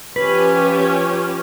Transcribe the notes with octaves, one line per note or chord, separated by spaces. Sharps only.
F3 C#4 G4 B4